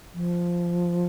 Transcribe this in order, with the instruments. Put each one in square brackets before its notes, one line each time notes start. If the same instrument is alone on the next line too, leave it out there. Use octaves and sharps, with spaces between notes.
[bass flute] F3